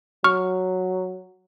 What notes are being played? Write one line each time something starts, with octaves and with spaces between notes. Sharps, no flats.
F#3 C#6 F6